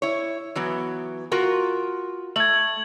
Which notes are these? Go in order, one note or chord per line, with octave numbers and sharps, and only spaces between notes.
E4 C#5
E3 F#3 B3
F4 F#4 A#4
A3 G#6 F#7